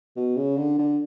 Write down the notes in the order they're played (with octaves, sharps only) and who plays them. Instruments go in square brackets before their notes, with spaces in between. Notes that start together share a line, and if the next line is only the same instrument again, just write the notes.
[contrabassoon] B2
C#3
D3
D3